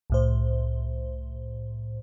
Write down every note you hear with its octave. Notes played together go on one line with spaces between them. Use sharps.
C2 A2 C5